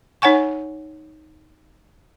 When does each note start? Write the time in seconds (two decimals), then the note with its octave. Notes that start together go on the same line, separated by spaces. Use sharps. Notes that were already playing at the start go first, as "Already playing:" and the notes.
0.22 D#4 C#5 F#5 G#5 C#6